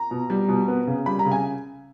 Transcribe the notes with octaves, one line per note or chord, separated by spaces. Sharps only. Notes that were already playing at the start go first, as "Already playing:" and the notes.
Already playing: A#5
B2
G3
B2
B3
C#3
G3 B5
A#5
C#3
G#5